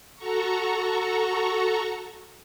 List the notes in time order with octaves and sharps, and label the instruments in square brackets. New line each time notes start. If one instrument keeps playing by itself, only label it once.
[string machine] F#4 A4 A#5 C#6